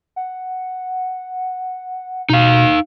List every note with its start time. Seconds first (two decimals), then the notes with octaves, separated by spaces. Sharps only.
0.16 F#5
2.30 B2 D#4 F5